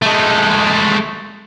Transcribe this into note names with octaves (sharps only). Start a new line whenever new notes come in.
G#3 A3